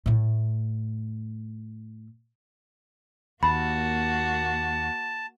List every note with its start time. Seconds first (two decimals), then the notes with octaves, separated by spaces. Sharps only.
0.06 A2 A3
3.43 D#2 A#3 F#4 A5 B5